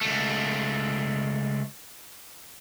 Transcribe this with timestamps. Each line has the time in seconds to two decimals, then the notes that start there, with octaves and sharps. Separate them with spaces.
0.01 C#2 A3